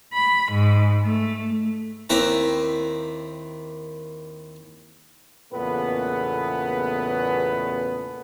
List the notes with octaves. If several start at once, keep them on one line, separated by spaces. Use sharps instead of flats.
B5
G#2
A3
D#2 C4 E4 B4 A#5
E2 A#2 C#3 A3 B3 B4